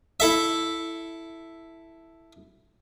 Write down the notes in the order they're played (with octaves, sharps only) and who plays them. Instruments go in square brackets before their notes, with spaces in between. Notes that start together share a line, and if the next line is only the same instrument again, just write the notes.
[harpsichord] E4 A4 E5